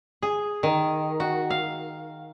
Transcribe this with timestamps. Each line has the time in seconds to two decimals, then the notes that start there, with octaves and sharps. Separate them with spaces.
0.22 G#4
0.63 D#3
1.20 F#4
1.50 F5